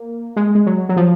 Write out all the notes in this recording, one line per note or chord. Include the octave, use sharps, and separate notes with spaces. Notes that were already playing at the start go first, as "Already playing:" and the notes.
Already playing: A#3
G#3
G#3
F#3
F#3
F3